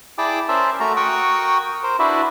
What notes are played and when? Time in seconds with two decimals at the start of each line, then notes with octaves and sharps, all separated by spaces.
0.18 E4 G#4 D5 G5 A5 D6
0.49 C#4 A#4 C5 D5 E5 A5
0.80 A3 F#4 A#4 A#5
0.96 F#4 A#4 F#5 G5 C#6 D#6
1.83 A#4 C5
1.99 D4 E4 F#4 B4 D5 E5